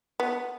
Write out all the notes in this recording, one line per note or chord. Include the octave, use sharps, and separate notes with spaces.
B3